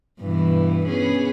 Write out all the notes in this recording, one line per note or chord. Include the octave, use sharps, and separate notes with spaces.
G2 B2 E3
B3 C#4 G#4